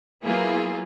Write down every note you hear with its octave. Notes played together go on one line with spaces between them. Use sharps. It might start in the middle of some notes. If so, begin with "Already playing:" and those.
F#3 A#3 B3 E4 F4 G#4